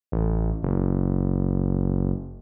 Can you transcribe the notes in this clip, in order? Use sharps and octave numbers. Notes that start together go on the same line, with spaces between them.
A1
F#1